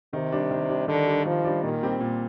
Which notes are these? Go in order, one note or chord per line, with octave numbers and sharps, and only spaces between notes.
C3 D#3
G3 D4
D#3
G3 D4
D3 D#3
G3 D4
D#3 F3
G3 D4
A#2 D#3
G3 C4 G4
A#2